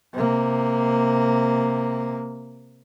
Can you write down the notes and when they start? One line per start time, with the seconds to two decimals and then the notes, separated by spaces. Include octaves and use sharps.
0.13 C3 A#3